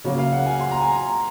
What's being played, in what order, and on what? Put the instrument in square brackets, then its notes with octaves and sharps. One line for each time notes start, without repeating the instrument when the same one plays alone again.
[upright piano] C#3 F#3 A#3 [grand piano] C#5
[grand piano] F5
F#5
G#5
C6
A#5
G#5
A#5